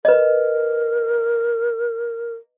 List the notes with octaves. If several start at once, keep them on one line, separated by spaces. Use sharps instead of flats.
A#4 B4 D#5